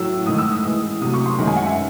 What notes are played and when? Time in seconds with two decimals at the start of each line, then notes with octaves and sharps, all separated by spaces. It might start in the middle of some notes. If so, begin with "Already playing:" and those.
Already playing: A2 F#3 A3 E6
0.26 G#2 D#3 A3 D#6
0.38 E6
0.52 D#6
0.63 A2 E3 G#3
1.01 C3 F#3 A3 D#6
1.14 C#6
1.26 C6
1.38 F#2 D#3 G#3
1.47 G#5
1.56 F#5
1.66 E5